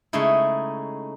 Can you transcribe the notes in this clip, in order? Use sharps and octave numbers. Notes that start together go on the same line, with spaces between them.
C#3 G#3 A3 D#4 E4